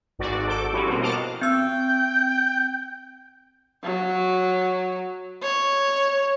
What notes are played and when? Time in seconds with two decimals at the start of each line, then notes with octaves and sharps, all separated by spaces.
0.19 G#1 G#2 F#4 D5
0.48 A4 D6 G6
0.72 F3 G3 C#4 E4 F#4
0.87 B2 A#3 C4
1.01 D#5 F5 F#5 A5 D6 F6
1.41 C4 G5 E6
3.84 F#3
5.43 C#5